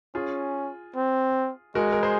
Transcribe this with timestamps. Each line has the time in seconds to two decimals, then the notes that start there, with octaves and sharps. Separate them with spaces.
0.14 C#4 F4 G#4
0.96 C4
1.75 G#3 F#4 A#4
1.92 A#4
2.03 G#4 C5